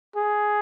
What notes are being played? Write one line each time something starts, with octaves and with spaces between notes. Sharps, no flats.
G#4